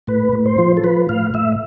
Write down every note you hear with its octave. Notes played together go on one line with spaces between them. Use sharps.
A2 B4
A2
C5
F3
A4
F3 B4
A2 F5
A2 E5